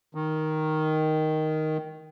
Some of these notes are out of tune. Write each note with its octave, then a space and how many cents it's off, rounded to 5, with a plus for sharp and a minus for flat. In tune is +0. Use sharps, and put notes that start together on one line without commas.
D#3 +0